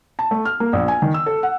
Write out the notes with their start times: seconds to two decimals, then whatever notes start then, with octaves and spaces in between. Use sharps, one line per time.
0.19 A5
0.31 A3
0.45 F6
0.60 A#3
0.73 A#1
0.88 G#5
1.02 D#3
1.14 E6
1.26 A4
1.43 F#5